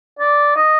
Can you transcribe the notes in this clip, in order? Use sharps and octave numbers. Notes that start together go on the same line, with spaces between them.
D5
D#5